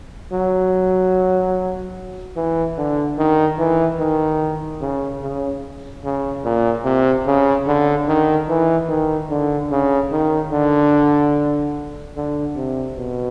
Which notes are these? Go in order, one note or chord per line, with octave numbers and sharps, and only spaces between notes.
F#3
E3
D3
D#3
E3
D#3
C#3
C#3
C#3
A#2
C3
C#3
D3
D#3
E3
D#3
D3
C#3
D#3
D3
D3
C3
B2